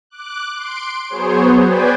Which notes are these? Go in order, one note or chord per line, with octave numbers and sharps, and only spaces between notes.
D6 F#6
C6 D7
F#3 B3 G#4 C5 C#5
B4 C5 D5 G5 G#5